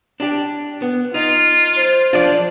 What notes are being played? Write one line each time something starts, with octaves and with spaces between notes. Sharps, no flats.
D4 G4
B3
D#4 F4
C5
F3 D4 F4 D5